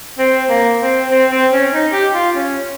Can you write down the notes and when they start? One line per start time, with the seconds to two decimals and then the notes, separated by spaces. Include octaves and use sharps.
0.18 C4
0.49 A#3
0.80 C4
1.11 C4
1.31 C4
1.52 C#4
1.73 D#4
1.92 G4
2.14 F4
2.35 C#4